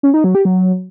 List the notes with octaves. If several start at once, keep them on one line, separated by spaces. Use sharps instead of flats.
C#4
D#4
F#3
G4
F#3